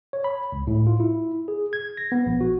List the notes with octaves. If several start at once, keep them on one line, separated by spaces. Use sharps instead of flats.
C#5
B5
C#2
A2
F4
E4
G#4
G#6
A#6
B3
A#1
F#4